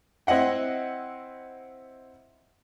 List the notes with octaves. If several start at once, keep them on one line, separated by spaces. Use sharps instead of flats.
C4 E4 D#5 F#5 G5